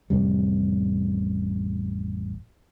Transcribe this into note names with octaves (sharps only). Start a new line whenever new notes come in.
A1 F2 C3 G3